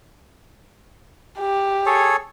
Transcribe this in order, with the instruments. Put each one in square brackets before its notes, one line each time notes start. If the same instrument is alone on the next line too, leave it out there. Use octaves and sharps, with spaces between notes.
[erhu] G4
[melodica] G#4 A4 C#5